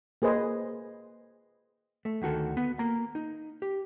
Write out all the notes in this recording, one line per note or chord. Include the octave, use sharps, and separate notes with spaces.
A#3 G#4 B4 C5 D#5
A3
D2 D#3 F#4 A4
B3
A#3 A#5
D#4
G4